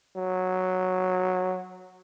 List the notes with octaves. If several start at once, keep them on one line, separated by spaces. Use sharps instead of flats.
F#3